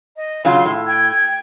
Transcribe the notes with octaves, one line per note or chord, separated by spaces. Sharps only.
D#5
C#3 F#3 F4 C6
A2
G5 G#6